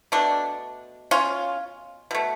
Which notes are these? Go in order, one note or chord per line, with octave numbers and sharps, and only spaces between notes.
B2 A3 D4
C#4 F4
B2 A3